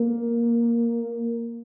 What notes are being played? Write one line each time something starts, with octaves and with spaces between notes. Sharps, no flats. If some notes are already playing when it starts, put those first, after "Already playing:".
Already playing: A#3